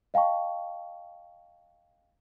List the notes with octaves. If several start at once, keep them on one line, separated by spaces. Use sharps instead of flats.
D#5 F5 G5 A5 C#6